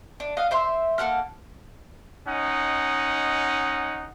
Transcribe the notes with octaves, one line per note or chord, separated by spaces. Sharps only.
D4
D#5 F5 F#5
C5 E5 C6
A#3 A4 F#5 F6
C#4 D#4 D#5 F#5